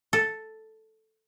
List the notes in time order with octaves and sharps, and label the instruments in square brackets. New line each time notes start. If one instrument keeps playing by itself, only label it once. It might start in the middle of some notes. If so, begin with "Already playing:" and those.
[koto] A4